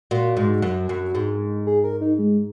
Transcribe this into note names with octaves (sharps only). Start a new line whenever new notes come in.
A#2 F#4
G#2
F#2
F#2
G#2
G#4
A#4
D#4
G#3